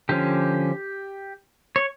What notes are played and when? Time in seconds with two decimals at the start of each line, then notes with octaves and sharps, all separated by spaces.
0.09 D3 F3 C#4 G4
1.76 C#5